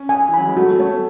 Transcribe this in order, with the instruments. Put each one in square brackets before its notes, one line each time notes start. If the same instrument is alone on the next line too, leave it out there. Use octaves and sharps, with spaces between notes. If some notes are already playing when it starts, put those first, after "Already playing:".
Already playing: [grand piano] C#4
[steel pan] G#5
[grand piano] E3
[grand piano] F#3 [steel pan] B5
[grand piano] G#3
[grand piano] A3 [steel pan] F#4
[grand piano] A3 [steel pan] C#5